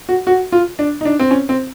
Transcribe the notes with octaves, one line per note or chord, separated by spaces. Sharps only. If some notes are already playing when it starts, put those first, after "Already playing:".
F#4
F#4
F4
D4
D#4
D4
C4
C#4
C4